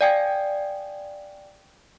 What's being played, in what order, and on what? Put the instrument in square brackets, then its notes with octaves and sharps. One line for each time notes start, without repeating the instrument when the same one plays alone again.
[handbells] D5 F5 G5 G#5 D#6 G#6